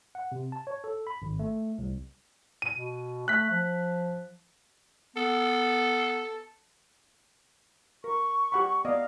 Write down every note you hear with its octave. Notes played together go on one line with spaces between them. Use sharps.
F#5
C3
A5
C#5
A4
B5
G#1
A3
C2
D#7
B2
A3 F#6 B6
F3
B3 A4
A#4 C#6
G4 F#5 B5
B3 D5 D#5 F5